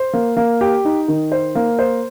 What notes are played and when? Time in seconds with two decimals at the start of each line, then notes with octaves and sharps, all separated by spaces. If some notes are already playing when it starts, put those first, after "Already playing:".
Already playing: C5
0.14 A#3
0.37 A#3
0.61 G4
0.85 D#4
1.08 D#3
1.32 C5
1.55 A#3
1.79 C5